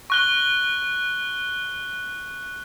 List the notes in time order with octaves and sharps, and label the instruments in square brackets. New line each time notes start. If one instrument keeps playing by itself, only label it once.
[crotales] C#6 F#6 G7